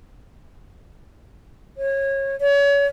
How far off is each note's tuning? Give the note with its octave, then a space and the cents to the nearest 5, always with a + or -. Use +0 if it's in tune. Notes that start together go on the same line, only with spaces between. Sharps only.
C#5 -25
C#5 +35